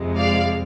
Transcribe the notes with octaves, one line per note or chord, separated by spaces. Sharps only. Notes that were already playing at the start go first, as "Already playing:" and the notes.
Already playing: F2 C3 F3 G#3
D5 F5